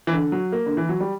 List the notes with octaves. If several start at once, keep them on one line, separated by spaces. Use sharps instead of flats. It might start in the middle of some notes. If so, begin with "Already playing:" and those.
E3
D3
F#3
A#3
D3
E3
F#3
G3